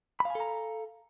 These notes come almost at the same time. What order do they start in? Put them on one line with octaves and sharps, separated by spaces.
B5 F5 G#5 A4 A#5